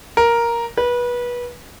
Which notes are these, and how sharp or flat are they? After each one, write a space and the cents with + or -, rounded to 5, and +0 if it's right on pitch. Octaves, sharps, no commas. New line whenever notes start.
A#4 +5
B4 -25